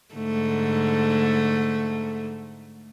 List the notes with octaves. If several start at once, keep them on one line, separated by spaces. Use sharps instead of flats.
G#2 D3 A3